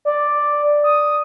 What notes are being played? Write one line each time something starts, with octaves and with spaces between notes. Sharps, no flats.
D5
D#6